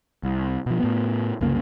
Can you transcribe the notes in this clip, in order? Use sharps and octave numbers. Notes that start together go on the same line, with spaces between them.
C2
B2 F3
A2 B3
C2 F#2 C#3 A#3